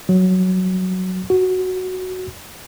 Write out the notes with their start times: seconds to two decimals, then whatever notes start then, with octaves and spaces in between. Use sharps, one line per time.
0.09 F#3
1.30 F#4